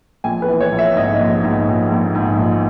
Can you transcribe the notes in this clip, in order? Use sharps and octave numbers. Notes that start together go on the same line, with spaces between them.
A#1 G#5
B4
E3
C#5
A#1
E5
G#2 D#5
A#1
G#2
A#1
A#1
G#2
A#1